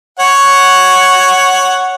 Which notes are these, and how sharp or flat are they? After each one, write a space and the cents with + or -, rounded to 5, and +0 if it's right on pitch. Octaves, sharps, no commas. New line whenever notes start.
C#5 +0 F#5 +0